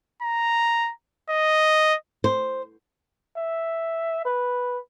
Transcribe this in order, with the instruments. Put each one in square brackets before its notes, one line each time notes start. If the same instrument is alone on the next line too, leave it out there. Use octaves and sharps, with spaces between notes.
[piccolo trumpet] A#5
D#5
[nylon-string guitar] C5
[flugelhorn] E5
B4